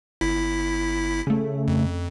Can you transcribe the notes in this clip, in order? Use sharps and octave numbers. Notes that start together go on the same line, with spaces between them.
G1 E4 B6
C#3 A3
F2